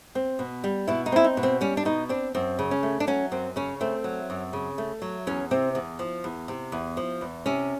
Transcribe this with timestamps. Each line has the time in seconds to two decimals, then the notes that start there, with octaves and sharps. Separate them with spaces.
0.15 C4
0.39 B2
0.64 G3
0.88 B2 E4
1.06 D#4
1.12 C4 E4
1.24 D#4
1.37 B2
1.43 C4
1.61 G3 C#4
1.77 D4
1.85 B2 D#4
2.09 C4 D4
2.35 F#2 C4
2.59 C#3
2.71 C#4
2.83 A3
3.00 D4
3.07 F#3 C#4
3.32 F#2 C4
3.56 C#3 C#4
3.81 A3 C4
4.04 F#3
4.30 F#2
4.53 C#3
4.78 A3
5.02 F#3
5.27 E2 C#4
5.51 C3 C4
5.75 E2
5.99 F3
6.24 E2
6.48 C3
6.72 E2
6.97 F3
7.21 E2
7.46 C3 C#4